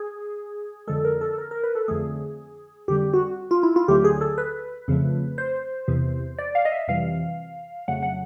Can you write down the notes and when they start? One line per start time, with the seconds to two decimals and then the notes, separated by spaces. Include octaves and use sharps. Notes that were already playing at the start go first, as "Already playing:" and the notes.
Already playing: G#4
0.87 F2 D3 F3 G#3 A4
1.05 A#4
1.21 A4
1.38 A#4
1.51 A#4
1.64 B4
1.75 A4
1.88 F2 D3 F3 A3 G#4
2.88 F2 D3 G3 G4
3.14 F#4
3.51 F4
3.63 E4
3.76 F4
3.88 D2 D3 F#3 A3 G4
4.04 G#4
4.21 A4
4.38 B4
4.88 F2 C#3 F3 A3
5.38 C5
5.88 E2 C3 E3
6.38 D5
6.55 F5
6.65 D#5
6.72 E5
6.88 F2 C3 E3 G3 F5
7.88 F2 C#3 F#3 A3 F#5
8.03 F#5